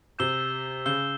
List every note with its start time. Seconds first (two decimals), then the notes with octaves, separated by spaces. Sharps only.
0.19 C3 E6 G6 C7 E7 G7
0.85 C#3 E6 G6 C7 E7 G7